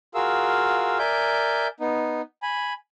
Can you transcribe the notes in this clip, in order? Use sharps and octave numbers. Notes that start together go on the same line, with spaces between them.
F4 F#4 G#4 A#4 F5 E6
A#4 D5 E5 G#5 D6 G6
B3 D#4
G#5 B5